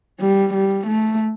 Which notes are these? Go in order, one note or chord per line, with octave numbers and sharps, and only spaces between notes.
G3
G3
A3